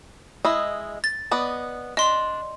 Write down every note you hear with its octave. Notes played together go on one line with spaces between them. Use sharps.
G#3 E4 D#5
A6
B3 D5 D#5
D4 D#5 C6